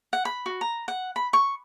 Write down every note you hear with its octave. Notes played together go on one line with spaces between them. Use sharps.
F#5
B5
F#4
A#5
F#5
B5
C#6